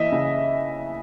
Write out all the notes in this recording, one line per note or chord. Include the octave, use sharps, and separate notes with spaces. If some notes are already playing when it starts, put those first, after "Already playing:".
Already playing: E3 D#5 E5
C#3